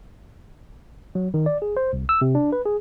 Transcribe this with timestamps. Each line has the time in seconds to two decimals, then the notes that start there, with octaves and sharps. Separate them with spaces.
1.15 F#3
1.34 D#3
1.46 D5
1.62 G#4
1.77 C5
1.93 C2
2.09 E6
2.21 C3
2.35 D4
2.52 B4
2.65 G#4